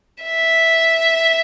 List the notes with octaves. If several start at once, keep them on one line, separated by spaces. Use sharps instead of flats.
E5